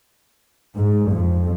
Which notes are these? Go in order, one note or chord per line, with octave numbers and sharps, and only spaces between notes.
G#2
F2